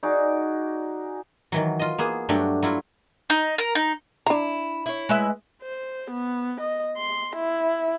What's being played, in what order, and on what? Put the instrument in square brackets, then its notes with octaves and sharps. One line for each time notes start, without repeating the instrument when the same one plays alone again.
[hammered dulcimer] D#4 F#4 G#4 D5
[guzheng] D#3 E3 F#3
F4 D#5
A#3 B3 G#4
G2 F#3 A3 D4 G4
F#3 E4 F4
[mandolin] D#4
A#4
D#4
[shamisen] D4 A#5 [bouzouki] E4
[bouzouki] E4 C#5
[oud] G#3 B4 E5
[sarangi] C5
B3
D#5
C6
E4